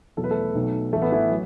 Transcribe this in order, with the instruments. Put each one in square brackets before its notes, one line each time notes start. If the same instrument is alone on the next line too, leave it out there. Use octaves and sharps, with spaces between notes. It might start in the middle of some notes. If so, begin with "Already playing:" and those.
[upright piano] E2 B2 F#3 A4
B4
A3 A4
B1 B2 F#3
A1 A2 E3 A3 A4
B3 B4
E3 E4
F#3